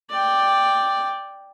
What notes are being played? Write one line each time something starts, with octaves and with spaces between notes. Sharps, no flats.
D5 G5